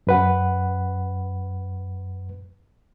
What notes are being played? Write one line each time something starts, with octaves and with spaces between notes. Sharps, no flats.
F#2 B4 F#5